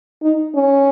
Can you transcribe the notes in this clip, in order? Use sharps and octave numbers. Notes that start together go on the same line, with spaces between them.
D#4
C#4